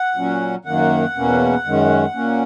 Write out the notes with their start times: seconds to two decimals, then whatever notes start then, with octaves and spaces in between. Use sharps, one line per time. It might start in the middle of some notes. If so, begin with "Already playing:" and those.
Already playing: F#5
0.15 A#2 F#3 C#4
0.65 F#2 D#3 A#3 F#5
1.16 E2 B2 A#3 C#4
1.65 F#2 D#3 G#3 C#4
2.15 A#2 A#3 C#4